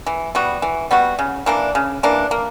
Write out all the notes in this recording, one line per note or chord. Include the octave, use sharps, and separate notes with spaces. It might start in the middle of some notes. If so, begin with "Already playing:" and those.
E3
G3 B3 F#4
E3
G3 B3 F#4
C#3
E3 A#3 D4
C#3
E3 A#3 D4
A#3